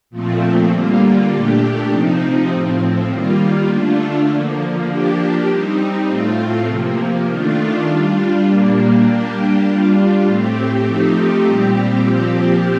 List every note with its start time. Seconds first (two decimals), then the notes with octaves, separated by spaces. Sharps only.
0.10 A#2 F3 A3 C4
0.70 D3 G3 A#3 F4
1.29 A#2 A3 D4 G4
1.89 C3 F3 C4 D#4
2.49 A2 F3 C4
3.09 D#3 G3 A#3 F4
3.69 D3 A3 D4 F4
4.28 D3 F3 A#3
4.87 F3 A#3 D4 G4
5.48 G3 C4 D#4
6.07 A2 A3 C4 F4
6.67 C3 F3 A#3
7.27 D#3 A3 D4 F4
7.86 G3 D4 F4
8.46 A#2 G3 A#3 D4
9.06 G3 A#3 D4 G4
9.65 G3 D4 F4
10.25 A2 A3 C4 G4
10.85 F3 A3 C4 D#4 G4
11.44 A#2 G3 C4 G4
12.04 A#2 F3 C4 G4